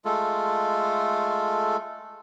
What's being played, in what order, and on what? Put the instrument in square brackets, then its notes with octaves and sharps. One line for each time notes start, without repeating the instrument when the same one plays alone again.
[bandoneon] G#3 A3 F4 A4